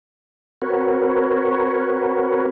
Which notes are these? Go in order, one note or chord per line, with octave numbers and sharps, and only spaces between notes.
C4 F#4 A#4 B4 C#5